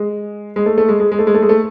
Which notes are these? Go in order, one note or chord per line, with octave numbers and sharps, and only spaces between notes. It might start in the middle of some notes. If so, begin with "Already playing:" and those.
Already playing: G#3
G#3
A3
A3
G#3
G#3
G#3
A3
G#3
A3
G#3
A3